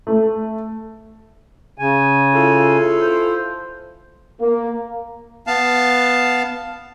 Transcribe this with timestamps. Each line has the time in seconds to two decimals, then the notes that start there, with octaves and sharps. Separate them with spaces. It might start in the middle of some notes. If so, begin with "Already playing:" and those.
0.07 A3
1.78 C#3 G#5
2.33 E4 F4 A4
3.01 C5
4.39 A#3
5.47 B3 F5 A5